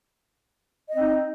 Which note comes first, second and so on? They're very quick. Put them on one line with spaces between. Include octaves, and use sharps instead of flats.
D#5 C4 D#4